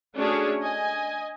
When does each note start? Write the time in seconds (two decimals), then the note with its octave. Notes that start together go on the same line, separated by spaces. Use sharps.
0.15 A3 C#4 D4 F#4 G#4 C#5
0.63 D#5 G#5